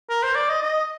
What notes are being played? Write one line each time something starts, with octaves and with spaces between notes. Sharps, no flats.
A#4
C5
D5
D#5
D#5